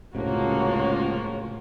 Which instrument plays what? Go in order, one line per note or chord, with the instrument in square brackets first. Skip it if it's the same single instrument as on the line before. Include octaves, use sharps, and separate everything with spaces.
[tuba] C#2 [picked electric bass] A2 C3 [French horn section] F3 A#3 C#4 [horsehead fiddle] F#4 C#5